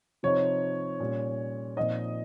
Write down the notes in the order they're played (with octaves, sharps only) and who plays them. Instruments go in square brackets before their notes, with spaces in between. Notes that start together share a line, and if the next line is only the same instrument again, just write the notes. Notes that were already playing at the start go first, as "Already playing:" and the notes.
[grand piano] C3 F3 C4 D#4 [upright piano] C#5
[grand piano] A#2 G3 C#4
[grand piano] A#2 F3 C4 D#4 [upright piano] D#5